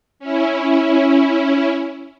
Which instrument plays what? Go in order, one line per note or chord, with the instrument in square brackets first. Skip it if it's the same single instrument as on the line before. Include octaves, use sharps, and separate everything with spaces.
[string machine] C#4 E4